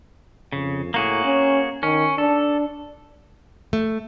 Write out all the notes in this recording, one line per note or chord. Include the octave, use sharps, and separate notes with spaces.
F2 C#3
A2 A#3 F#4 G#4
C#4
D#3 C#4
D4 A4
A3